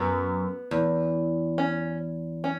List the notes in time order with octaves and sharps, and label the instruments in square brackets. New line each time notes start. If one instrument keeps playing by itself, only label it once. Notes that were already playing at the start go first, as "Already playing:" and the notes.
Already playing: [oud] F#2 [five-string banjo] B3
[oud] E2
[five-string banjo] C#4
C#4